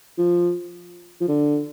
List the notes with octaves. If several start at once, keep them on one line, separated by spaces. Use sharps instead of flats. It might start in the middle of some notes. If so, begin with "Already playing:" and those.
F3
F3
D3